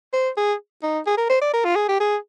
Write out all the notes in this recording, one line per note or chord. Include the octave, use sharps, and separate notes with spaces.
C5
G#4
D#4
G#4
A#4
C5
D5
A#4
F4
G#4
G4
G#4